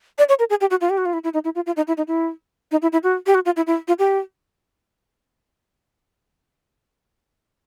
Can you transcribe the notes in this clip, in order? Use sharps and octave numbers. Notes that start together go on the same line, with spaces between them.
D5
C#5
A#4
G#4
G4
F#4
F4
G4
F#4
F4
E4
E4
D#4
E4
F4
F4
D#4
E4
D#4
E4
D#4
E4
E4
F#4
G4
F#4
F4
E4
E4
F4
G4